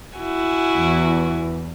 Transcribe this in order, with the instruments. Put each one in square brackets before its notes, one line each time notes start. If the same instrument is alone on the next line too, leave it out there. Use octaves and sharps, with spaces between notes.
[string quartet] E4 F#4 G#5
[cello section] E2